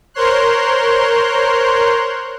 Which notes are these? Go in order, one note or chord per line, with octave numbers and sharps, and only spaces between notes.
A#4 C5 C#5 C6 F#6